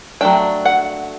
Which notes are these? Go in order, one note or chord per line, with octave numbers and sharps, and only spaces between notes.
F#3 A3 D4 G5
F#5